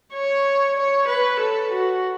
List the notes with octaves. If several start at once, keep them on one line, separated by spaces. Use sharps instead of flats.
C#5
C#5
B4
A4
F#4